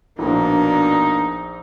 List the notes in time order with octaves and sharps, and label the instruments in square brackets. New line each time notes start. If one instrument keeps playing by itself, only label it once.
[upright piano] A#1 [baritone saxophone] B2 [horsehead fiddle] A#3 D4 [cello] D#4